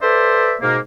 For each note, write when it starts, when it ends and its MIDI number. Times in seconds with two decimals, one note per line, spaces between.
0.02 0.56 69
0.02 0.56 71
0.02 0.56 72
0.02 0.56 74
0.02 0.56 76
0.61 0.78 44
0.61 0.78 47
0.61 0.78 58